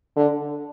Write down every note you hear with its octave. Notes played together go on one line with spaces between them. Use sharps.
D3